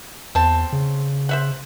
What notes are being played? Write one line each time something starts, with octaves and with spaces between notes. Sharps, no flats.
E2 C4 A5
C#3
C5 E5 F#5